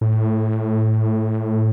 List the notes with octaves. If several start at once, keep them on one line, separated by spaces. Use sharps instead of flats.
A2